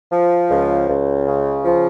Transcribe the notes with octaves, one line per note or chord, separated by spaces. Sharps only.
F3
C#2
C#2
C#3
F3